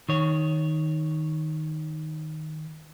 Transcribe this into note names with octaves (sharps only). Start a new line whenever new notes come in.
D#3 C#5